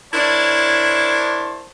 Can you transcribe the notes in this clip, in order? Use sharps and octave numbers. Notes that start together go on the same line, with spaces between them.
D4 E4 A#4 C5 C#5 A5